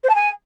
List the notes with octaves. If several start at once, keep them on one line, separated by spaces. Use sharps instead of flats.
C5
A5
G#5